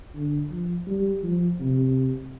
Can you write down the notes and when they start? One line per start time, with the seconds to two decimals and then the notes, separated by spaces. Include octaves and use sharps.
0.15 D3
0.51 F3
0.87 G3
1.23 F3
1.60 C3